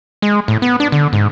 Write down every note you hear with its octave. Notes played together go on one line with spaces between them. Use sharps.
G#3
A2
B3
D4
D3
G#2